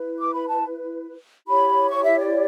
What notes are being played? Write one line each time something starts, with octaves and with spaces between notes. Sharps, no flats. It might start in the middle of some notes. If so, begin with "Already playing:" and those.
Already playing: E4 B4
D6
B5
A5
E4 G4 C#5 B5
C#6
E5
D5